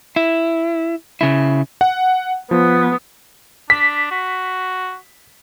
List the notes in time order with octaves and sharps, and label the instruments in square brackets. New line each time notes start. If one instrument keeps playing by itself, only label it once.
[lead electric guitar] E4
C#3 E4
[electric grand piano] F#5
[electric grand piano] F3 [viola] B3
[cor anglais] D4 [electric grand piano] B6
[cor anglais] F#4